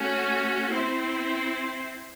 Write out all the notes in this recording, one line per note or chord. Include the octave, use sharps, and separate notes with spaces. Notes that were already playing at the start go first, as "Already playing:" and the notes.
Already playing: A3 C#4 F#4
C4 E4 C5